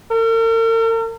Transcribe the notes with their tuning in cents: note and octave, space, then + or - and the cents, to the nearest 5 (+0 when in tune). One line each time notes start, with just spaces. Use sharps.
A#4 -45